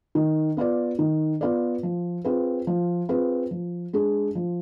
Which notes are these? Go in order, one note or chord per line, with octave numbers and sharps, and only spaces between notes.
D#3
B3 F4 B4 D5
D#3
B3 F4 B4 D5
F3
C4 F4 G#4 B4
F3
C4 F4 G#4 B4
F3
G#3 D4 G#4
F3